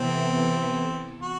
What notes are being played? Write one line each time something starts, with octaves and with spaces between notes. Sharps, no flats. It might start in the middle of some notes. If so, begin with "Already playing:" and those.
Already playing: C3 E3 B3 C4 E4 A4
F#4